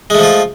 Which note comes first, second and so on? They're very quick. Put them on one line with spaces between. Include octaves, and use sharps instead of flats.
G#3 A3 F3 F4